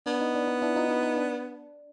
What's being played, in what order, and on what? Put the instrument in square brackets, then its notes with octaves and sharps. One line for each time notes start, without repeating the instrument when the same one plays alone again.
[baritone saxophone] B3 [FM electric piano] D4
[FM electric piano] D#4
D4
D#4
D4 E4
D#4 F4
D#4
D#4
D4